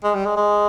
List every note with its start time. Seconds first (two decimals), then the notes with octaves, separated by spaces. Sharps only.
0.04 G#3
0.15 G3
0.25 G#3
0.36 G#3